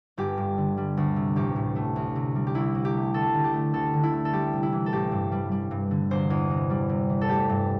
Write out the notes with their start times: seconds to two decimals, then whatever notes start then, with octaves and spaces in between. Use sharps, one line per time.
0.18 G1 G4
0.38 G2
0.58 D3
0.77 G3
0.97 D2
1.16 C3
1.36 A1 G4
1.56 A2
1.76 A3
1.96 D2
2.16 C3
2.35 G3
2.47 G4
2.55 C2 E4
2.75 C3
2.85 G4
2.94 A3
3.14 D2 A4
3.34 D3
3.44 G4
3.54 A3
3.73 D2 A4
3.93 D3
4.03 E4
4.13 A3
4.25 A4
4.32 G3 G4
4.53 C3
4.63 E4
4.72 E3
4.86 A4
4.92 A1 G4
5.12 G2
5.32 G3
5.52 G3
5.71 G2
5.91 D3
6.11 E1 C5
6.30 E2
6.50 C3
6.70 G3
6.89 C3
7.10 E3
7.21 A4
7.29 A3 G4
7.49 G2